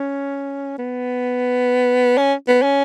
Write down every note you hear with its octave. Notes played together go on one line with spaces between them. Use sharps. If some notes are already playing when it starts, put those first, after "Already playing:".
Already playing: C#4
B3
C#4
B3
C#4